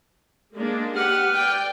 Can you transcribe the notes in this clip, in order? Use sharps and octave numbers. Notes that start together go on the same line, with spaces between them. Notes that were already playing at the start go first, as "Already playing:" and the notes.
G#3 A#3 D4
G4 B4 F#5 F6
D5 G5